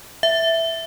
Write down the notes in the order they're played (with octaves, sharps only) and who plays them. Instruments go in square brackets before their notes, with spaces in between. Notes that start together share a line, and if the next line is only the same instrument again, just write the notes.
[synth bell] E5